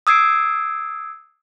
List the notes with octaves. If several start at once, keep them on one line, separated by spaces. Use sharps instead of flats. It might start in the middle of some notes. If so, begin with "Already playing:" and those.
D#6 E6 G#6 C7 D7